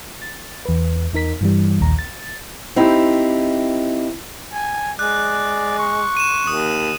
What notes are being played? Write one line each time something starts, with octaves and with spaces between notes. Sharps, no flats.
A6
E2 B4
E2 D#4 A#4 B6
G2 E3 G3
A#1 D#2 A#5
A6
C4 D#4 E4 G4
G#5
G#3 D5 F#6
C#6
D#7 E7
D#2 D#6